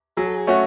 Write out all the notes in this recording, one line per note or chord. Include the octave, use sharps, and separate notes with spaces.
F#3 G#4
A4
G#4
A3 C#4 F#4 A4